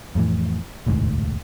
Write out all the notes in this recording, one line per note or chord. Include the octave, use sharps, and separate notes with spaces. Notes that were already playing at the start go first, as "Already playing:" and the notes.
F2 A2 E3
E1 A1 D2 G#2